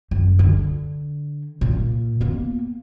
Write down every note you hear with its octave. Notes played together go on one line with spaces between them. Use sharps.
F#2
D3
A#2
A#3 B3